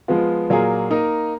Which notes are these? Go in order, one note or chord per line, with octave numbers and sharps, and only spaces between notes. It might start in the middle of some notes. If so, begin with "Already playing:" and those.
F3 G#3 B3 F4
A#2 F#3 A#3 F4 G#4
A#3 D#4 A#4 D#5